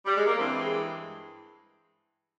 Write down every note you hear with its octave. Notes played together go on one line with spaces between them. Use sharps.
G3
G#3
A#3
G2 E3 C4
G#3